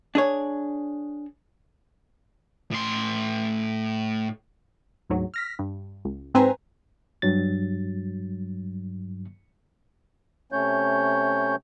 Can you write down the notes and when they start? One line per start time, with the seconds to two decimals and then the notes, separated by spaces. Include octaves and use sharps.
0.15 D4 G#4 C#5
2.71 A2 C6
5.10 D2 G#2 F#3
5.34 F6 A#6 B6
5.59 G2
6.05 C#2
6.34 G#2 C4 B4 C5 G#5 A#5
7.22 G2 F#3 A6
10.52 C3 A3 C#4 C#5 G6